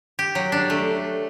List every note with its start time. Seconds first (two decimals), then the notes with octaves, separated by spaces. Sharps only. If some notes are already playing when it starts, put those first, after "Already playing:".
0.19 G4
0.35 F#3
0.52 D4
0.70 A3